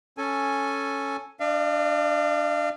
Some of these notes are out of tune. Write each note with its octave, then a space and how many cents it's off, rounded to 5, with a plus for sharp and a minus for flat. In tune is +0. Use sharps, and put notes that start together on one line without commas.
C#4 +0 A4 +0 G#5 +5
D4 +0 D5 +45 F5 -30